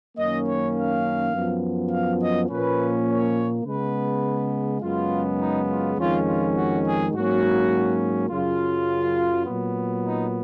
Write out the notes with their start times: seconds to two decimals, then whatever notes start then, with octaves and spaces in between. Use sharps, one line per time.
0.17 F#2 D#3 A#3 C#4 D#5
0.46 C#5
0.75 F5
1.33 F#2 F3 B3
1.91 F5
2.20 D#5
2.49 A#2 F3 A#3 C#4 B4
3.08 C#5
3.65 C#3 G#3 B3 B4
4.82 F#2 C#3 G#3 B3 F4
5.40 D#4
5.69 F4
5.97 F2 D#3 G#3 C#4 F4
6.27 F4
6.55 F#4
6.85 G#4
7.14 G#2 F#3 A#3 C#4 F#4
8.30 F#2 C#3 F#3 F4
9.46 A#2 F#3 B3
10.04 D#4